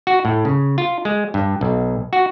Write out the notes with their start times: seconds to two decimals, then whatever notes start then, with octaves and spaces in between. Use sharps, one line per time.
0.07 F#4
0.25 A2
0.45 C#3
0.78 F4
1.05 G#3
1.34 G2
1.61 B1
2.13 F#4